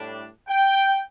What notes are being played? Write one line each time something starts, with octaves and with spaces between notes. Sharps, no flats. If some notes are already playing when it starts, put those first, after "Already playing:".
Already playing: A2 G3 D4
G5